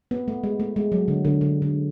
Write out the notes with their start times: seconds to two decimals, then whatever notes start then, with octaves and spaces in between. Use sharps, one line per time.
0.11 B3
0.28 A3
0.44 G#3
0.60 A3
0.76 G#3
0.92 F#3
1.08 D3
1.25 D3
1.41 D3
1.62 D3